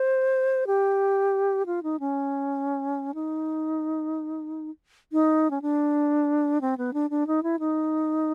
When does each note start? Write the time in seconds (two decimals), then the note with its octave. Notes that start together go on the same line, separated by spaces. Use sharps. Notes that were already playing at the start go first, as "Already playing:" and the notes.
Already playing: C5
0.67 G4
1.66 F4
1.83 D#4
2.00 C#4
3.14 D#4
5.12 D#4
5.50 C#4
5.62 D4
6.61 C4
6.78 B3
6.93 D4
7.10 D4
7.27 D#4
7.43 E4
7.59 D#4